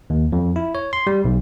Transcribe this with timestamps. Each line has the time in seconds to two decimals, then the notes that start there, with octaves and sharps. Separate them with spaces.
0.10 D#2
0.32 F2
0.56 E4
0.75 C#5
0.93 C6
1.07 G3
1.25 B1